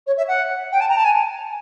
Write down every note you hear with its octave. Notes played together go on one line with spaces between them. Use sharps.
C#5
E5
F#5
G5
A5
A#5
A5
G#5